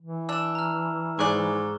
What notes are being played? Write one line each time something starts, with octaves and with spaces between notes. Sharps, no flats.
E3
D4 E6 E7
A#5 F6
G#2 G#4 D5 C#6 F#6 G7